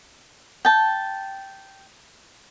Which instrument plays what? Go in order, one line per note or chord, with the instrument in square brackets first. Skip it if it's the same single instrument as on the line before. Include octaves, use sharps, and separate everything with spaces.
[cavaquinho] G5 A5